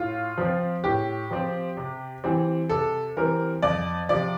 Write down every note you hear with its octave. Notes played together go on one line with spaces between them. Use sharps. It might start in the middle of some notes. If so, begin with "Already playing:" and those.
Already playing: A2 F4
F3 C4
A2 G4
F3 C4
C3
E3 G3 C4
C3 A4
E3 G3 C4 A#4
F2 D5
C3 F3 D5